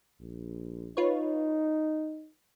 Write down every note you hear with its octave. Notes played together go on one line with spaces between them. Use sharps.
A#1
D#4 F4 B4 C#5